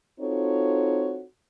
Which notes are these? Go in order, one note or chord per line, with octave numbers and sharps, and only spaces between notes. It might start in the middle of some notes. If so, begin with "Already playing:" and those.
C4 D#4 F4 F#4 A4 C#5